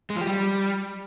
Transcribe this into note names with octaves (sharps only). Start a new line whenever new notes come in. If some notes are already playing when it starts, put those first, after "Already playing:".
G#3
F3
G4
G3